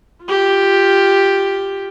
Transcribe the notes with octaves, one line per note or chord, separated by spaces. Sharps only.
F4 G4